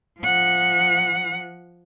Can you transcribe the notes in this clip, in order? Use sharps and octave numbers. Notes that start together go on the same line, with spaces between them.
F3 F#5